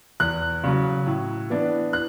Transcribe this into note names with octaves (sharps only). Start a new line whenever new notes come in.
E2 F#6
C#3 F#3
A2
E3 B3 D4
F#6